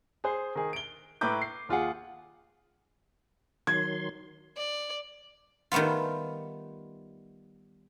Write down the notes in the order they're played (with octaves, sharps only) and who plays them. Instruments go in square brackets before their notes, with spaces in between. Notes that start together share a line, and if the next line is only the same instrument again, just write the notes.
[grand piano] G#4 C5
D#3 G#4
D7 G7
A2 E4 B4 A#5 D6 G6
C7
D#2 F4 G#4 F#5
[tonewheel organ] D#3 F#3 C6 [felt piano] G#6
[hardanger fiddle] D5
[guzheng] D#3 G3 A3 B3 F4